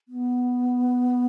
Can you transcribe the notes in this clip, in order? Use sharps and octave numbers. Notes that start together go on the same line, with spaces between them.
B3